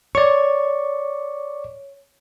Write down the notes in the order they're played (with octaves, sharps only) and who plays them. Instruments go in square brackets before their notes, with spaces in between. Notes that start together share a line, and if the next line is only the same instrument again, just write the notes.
[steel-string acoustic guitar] C#5 [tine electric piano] D5 C#6